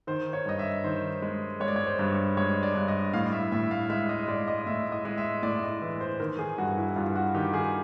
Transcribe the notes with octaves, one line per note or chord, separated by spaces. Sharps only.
D#3 C5
C#5
G2 D#5
E5
D#3 C5
G#3
G#3 C#5
D5
C#5
C5
G2
C#5
G#3 C#5
D5
G2
D#5
A2 F5
E5
A2 E5
F5
G#3 E5
D#5
G#3 D5
D#5
A2 E5
D#5
G#3
E5
A2 D5
E5
D#5
E3 E5
C5
D#3 A#4
G#4
G2 F#4
E4
G2 F4
F#4
D#3 G4
G#4